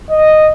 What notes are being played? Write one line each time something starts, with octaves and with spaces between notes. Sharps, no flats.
D#5